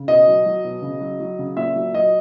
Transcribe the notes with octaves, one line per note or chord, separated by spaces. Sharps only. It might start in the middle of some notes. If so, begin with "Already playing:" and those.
Already playing: C#3
B2 D#5
F#3
F#3
B2
C#3
F#3
F#3
C#3
A#2 E5
F#3
F#3 D#5